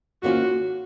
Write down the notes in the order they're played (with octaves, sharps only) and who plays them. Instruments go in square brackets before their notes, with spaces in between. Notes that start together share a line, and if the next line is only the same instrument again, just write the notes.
[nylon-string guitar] G#2 D#3 A#3 C#4 F4 [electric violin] F#4